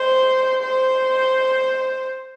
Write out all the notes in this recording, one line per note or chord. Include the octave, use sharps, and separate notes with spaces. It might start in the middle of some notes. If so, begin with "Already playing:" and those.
Already playing: C5
C5